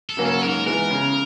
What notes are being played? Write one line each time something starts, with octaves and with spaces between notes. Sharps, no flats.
A4
C#3 F#3 A#3 C#4
A4
G#2 A#4
E3 G#3 B3 A#4
C#3